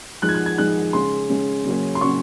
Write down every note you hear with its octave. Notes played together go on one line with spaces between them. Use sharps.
F3 G#3 D#4 F#6
G#6
F#6
G#6
F3 G#3 D#4 F#6
C#3 G#3 C#4 C6
C#3 G#3 C#4
C#3 F#3 A#3 C#4
C6
C#3 F#3 A#3 C#4 C#6